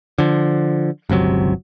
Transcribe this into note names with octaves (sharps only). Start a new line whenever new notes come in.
D3 F3
G1 C#2 C3 F#3